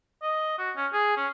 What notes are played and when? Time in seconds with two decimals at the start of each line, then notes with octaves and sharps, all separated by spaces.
0.22 D#5
0.58 F#4
0.77 C#4
0.93 G#4
1.17 C#4